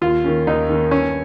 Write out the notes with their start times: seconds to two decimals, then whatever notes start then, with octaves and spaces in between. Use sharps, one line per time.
0.01 D#2 F4
0.24 D#3 A#3 C#4
0.47 D#2 D#4
0.70 D#3 A#3 C#4
0.91 G2 C#4